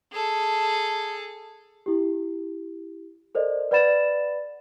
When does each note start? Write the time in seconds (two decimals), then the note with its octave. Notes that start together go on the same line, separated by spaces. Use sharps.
0.13 G#4 A4
1.86 E4 G4
3.35 A4 A#4 C5 D5 D#5
3.71 B4 D5 F#5 B5 A6 E7